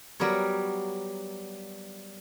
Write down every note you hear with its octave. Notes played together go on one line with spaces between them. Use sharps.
F#3 G3 B3 A#4 C#5